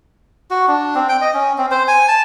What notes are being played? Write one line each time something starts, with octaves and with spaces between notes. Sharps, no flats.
F#4
D4
C4
G5
D#5
C#4
C4
C5
G#5
A5